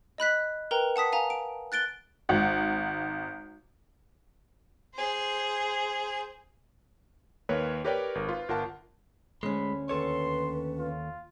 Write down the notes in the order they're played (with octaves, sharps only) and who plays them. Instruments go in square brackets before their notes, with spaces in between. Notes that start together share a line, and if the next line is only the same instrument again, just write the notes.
[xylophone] D#5 B5 F#6 B6
A#4 B4 G5 A#5
F#5 A5 D#6 B6
F5 G#5 A#5
D7
F#6 A6 D7 G7
[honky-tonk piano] G#1 F#5
[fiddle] G#4 C5
[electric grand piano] D#2 A#3 A#4 B4 C#5
G4 A#4 B4 C#5 D5 G5
G#1 A#4
F4 B4
G1 F4 A#4 F#5 A5
[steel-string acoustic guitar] D2 C#4 [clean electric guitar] G#3 [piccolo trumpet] B5
[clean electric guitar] D#2 A4 C#5 [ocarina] B4 [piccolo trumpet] C6
[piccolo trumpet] F4